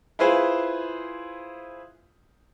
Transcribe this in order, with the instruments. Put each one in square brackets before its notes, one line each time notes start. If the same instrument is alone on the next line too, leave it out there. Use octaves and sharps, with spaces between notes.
[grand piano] E4 F4 G#4 B4 C5